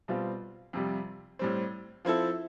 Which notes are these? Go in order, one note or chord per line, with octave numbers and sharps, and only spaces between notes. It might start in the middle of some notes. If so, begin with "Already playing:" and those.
B2 G3 C4 F4
F2 C3 G3
A2 G3 C4
F3 C4 E4 A4